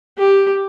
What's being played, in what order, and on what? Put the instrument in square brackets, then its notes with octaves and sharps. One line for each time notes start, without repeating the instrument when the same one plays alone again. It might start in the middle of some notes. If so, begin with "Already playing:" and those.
[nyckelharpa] G4